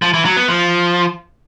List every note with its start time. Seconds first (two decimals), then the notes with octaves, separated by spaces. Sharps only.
0.02 F3
0.14 E3
0.25 F#3
0.37 B3
0.48 F3